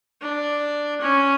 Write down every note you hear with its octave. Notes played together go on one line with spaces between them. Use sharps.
D4
C#4